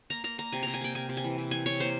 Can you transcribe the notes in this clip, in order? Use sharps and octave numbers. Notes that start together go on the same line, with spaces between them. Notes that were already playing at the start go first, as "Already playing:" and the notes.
A#3 A#5
A#3 A#5
A#3 A#5
C3 G#5
C3 A#5
G#5
A#3 G5
C3 G#5
C3
G#5
E3
C3
E3 G#5
C3 C#5
A#3 C5